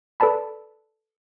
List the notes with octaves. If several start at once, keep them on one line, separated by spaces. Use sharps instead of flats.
A4 B4 D5 A5 B5